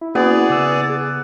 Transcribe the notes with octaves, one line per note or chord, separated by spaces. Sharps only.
E4
A#3 B3 C#4 F#4 G#4 D5
C#3 D6 E6
A6
G#4